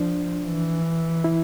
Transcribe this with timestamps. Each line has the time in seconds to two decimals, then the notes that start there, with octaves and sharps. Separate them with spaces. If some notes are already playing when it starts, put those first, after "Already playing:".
Already playing: F3 D4
0.46 E3
1.24 E4